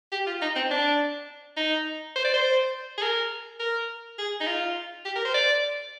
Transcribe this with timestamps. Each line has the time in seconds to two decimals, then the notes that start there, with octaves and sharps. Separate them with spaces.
0.12 G4
0.26 F4
0.42 D#4
0.56 C4
0.71 D4
1.57 D#4
2.16 C5
2.24 D5
2.34 C5
2.98 G#4
3.02 A#4
3.59 A#4
4.18 G#4
4.40 D#4
4.47 F4
5.05 G4
5.16 A#4
5.25 C5
5.34 D5